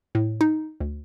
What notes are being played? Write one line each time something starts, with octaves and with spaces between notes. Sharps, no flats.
A2
D#4
D2